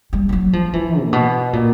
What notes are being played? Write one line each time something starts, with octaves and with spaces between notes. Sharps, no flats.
G3
F3
F#3
F3
E3
A#2
B2
A#2